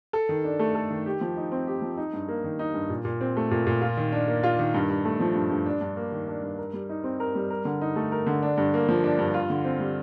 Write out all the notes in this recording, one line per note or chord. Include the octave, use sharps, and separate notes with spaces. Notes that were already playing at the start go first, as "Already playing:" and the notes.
A4
D#3
D4
A3
A4
D#3
G4
F3
D#4
C4
G4
F3
D#4
G2
A#3
D#3
D#4
G2
A#2
A#2
C4
A3
A#2
A#2
F4
D#3
D4
A#3
F4
D#3
G2
G2
A3
F3
G2
G2
D4
G2
A#3
D#3
D4
G2
A#4
G3
D#4
C4
A#4
G3
A#4
D3
D#4
A3
A#4
D3
D4
G2
A#3
F3
D4
G2
F4
D3
C4
G3